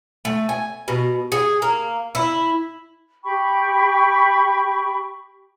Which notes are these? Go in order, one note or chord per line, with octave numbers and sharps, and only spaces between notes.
A3
G#5
B2
G#4
A#3
E4
G4 G5 B5 C#6